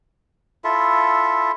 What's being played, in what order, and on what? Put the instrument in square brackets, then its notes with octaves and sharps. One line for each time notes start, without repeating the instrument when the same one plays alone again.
[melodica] E4 F4 A4 E5